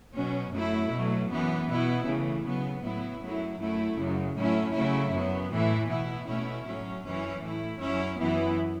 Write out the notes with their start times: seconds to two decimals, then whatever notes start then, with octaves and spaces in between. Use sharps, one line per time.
0.15 B2 F#3 C#4
0.53 F#2 F#3 A3 E4
0.91 B2 F#3 A3
1.30 F#2 E3 B3
1.69 B2 B3 E4
2.06 C#3 E3 A3
2.44 C#3 F#3 B3
2.83 A2 F#3 B3 E4
3.21 F#2 F#3 A3 E4
3.60 F#2 F#3 A3 E4
3.98 F#2 C#3 F#3
4.36 A2 F#3 A3 C#4 E4
4.74 C#3 F#3 A3 E4
5.12 F#2 F#3 B3
5.51 A2 E3 A3 E4
5.89 B2 B3 E4
6.27 B2 A3 C#4 E4
6.66 A2 F#3 C#4
7.05 F#2 E3 C#4 E4
7.42 A2 A3 E4
7.80 F#2 F#3 C#4 E4
8.19 F#2 E3 B3 E4